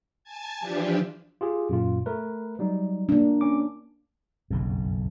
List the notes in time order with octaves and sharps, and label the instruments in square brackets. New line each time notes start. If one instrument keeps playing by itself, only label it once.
[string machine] G#5 A5 G#6
E3 F3 D4 G4
[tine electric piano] F4 G4 G#4
F#2 A#2 F4
A3 A#4 B4
F#3 G3 D#4
[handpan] A#3 D4
[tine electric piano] C#4 D6
[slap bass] F#1 B1 F2